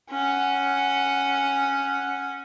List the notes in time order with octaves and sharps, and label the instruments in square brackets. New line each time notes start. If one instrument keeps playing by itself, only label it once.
[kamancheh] C#4 F#5